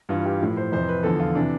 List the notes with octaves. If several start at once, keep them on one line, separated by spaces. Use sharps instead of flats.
G2 E3 F4
G4
A2 F3
C5
F2 C3 E3 C5
B4
E2 D3 F3 A4
F4
C3 E3 D4